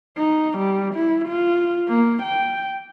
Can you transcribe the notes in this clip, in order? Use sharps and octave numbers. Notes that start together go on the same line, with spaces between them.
D#4
G3
E4
F4
A#3
G5